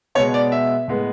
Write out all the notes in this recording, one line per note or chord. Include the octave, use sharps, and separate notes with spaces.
B2 G#3 B3 C#5
D5
E5
A2 G#3 B3